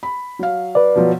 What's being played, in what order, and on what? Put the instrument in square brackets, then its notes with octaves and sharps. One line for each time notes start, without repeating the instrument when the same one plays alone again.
[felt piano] B5
F#3 F5
[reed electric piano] B4 D5
[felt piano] B2 F3 F#3